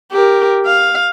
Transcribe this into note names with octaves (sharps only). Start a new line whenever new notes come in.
G4 A#4
F5